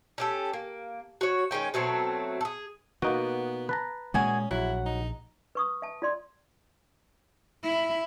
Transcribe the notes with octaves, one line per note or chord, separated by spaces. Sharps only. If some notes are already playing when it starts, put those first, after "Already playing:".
C#4 G4 A4
A#3
F#4 C#5
D#3 G#3 C#4 G5
B2 F#3 A3 C4
G#4 A4
B2 A#3 B3 D#4 F#4
B4 A5 A#5
A#2 G#3 A#3 C#4 F#4 G#4 G#5
A#1 F#3 E4 F#5
D#4
B4 C#6 D#6
E5 A5
F4 D5 C6
E4